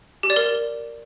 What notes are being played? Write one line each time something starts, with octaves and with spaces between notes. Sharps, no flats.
G4
D5
A#4